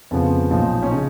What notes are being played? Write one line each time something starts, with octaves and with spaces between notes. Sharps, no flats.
F2 C#3 F3 B3
B1 A#2 F3 D#4
C#4
C#3 D#4